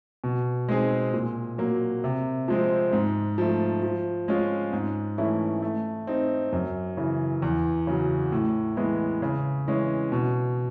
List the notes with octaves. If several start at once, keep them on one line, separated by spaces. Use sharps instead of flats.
B2
G#3 C4 D#4 G#4
A#2
F#3 A#3
C3
F3 G#3 C4
G#2
F3 A3
F3
G#3 C#4 F4
G#2
E3 A3 C#4 E4
A3
C4 D#4
F#2
C#3 E3
E2
C#3 F#3
A2
E3 G#3 B3
C#3
E3 G#3 C#4
B2